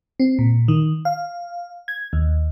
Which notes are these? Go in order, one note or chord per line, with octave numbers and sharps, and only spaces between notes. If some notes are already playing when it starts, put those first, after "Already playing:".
C4
A#2
D#3
F5
G#6
D#2